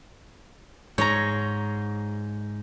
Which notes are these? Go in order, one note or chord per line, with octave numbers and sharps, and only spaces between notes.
G#2 C#5 A#5